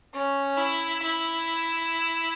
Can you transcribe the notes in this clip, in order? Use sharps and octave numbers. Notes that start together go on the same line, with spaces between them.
C#4
E4
E4